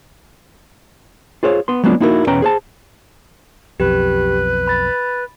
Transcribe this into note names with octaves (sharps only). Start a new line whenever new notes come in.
F4 G#4 C5 C#5 F5
B3 C6
F#3 G#3 A#3 B3 D4 F4
A#3 D#4 E4 F#4 G4 A#4
E2 B2 C#4 B4 G5 A#5
G#4 C5 A5
B1 F2 G4 B4
B5 A6